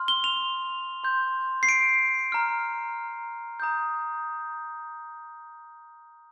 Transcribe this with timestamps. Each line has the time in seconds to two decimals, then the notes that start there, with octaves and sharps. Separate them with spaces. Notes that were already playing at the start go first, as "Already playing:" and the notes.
Already playing: C6 F6
0.08 G7
0.24 F7
1.04 C6 G6
1.63 C7
1.69 D7
2.32 A#5 F6
3.60 A#5 D#6 G6